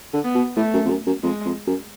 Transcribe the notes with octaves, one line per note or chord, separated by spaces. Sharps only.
D3
B3
B2
A2 A3
F#2
F2
F#2
F#2
F2 G#3
F2
F#2